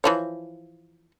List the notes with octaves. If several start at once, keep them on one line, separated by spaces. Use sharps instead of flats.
E3 F3 C#5